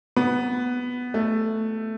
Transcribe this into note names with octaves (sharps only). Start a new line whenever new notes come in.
B3
A3